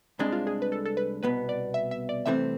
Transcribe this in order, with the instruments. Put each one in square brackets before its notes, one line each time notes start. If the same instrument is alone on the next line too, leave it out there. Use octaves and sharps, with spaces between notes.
[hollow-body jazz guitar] C2 C3 G#3 D4 [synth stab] G#4
[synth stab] F4
G#4
B4
A4
A4
B4
[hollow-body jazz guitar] C2 B2 B3 [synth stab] B4
[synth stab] D5
E5
E5
D5
[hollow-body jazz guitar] C2 C3 E3 A3 C4 [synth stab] E5